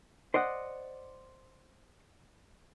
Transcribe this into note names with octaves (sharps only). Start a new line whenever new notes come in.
C5 D5 D#5 F#5